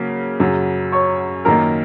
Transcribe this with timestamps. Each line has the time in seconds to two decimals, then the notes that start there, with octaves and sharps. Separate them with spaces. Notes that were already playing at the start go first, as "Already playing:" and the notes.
Already playing: C#3 F#3 A#3
0.40 F#2 C#3 F#3
0.92 C#5 C#6
1.45 F#2 D#3 A#3 A#4 A#5